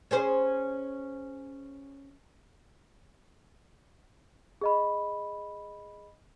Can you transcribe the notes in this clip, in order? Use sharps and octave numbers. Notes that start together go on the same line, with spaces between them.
C#4 G#4 C5
G#4 D#5 B5